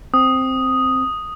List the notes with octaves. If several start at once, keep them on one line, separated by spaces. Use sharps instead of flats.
C4 D#6